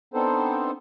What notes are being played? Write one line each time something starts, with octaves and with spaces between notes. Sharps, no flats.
B3 C4 D4 D#4 A4 C5